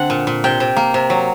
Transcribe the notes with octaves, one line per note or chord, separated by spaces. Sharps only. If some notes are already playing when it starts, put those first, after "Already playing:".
Already playing: D3 C4 F#5
A#2
A#2
C3 G5
C3
A#3
C3
F#3